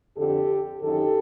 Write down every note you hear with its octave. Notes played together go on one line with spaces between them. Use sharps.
F2 D3 G4 A4
F#2 D#3 G4 A4